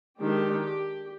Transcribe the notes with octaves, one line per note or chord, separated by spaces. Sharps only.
D#3 G#3 D4 G4
G4